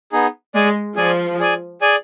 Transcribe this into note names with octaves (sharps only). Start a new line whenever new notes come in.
B3 D#4 G#4
G#3 G#4 D5 G#5
F3 G#4 D5 G#5
G#4 D5 G#5
G#4 D5 G#5